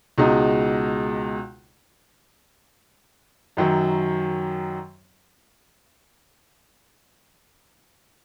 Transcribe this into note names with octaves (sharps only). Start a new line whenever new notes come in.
C#2 B2 G#3 D#4
F#2 D#3 F#3